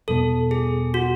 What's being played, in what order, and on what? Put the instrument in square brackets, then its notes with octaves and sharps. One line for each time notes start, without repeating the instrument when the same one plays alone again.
[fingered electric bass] E2 B2 G3 B3 [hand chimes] A4
[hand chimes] G#4
F#4